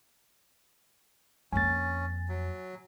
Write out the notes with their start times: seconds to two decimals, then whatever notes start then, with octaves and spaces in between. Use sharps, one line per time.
1.53 F2 A#3 C#4 G#5 A6
2.28 F#3